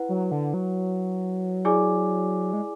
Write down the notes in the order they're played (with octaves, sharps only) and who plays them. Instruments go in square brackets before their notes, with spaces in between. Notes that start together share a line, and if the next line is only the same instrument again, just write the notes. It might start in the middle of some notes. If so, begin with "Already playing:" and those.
Already playing: [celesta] E4 B4 F#5
[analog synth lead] F#3
D3
F#3
[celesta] E4 G#4 D5 G#5 D6
[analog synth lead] G#3